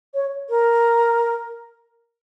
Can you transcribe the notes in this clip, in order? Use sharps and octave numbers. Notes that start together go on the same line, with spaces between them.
C#5
A#4